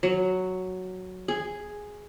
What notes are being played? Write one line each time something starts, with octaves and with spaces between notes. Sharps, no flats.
F#3
G#4